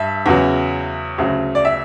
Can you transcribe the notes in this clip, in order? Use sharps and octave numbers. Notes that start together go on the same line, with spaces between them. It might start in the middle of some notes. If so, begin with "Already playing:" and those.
Already playing: G2 E5
E2 C#3 F#3
D2 C#3 F#3
D5
E5